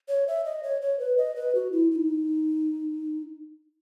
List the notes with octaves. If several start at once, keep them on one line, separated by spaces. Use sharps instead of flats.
C#5
E5
D#5
C#5
C#5
B4
D#5
B4
F#4
E4
E4
D#4